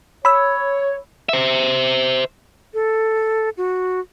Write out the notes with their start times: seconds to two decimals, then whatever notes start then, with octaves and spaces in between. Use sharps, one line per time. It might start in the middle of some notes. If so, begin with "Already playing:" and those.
0.25 C#5 B5 E6
1.29 C5 E5
2.74 A4
3.57 F#4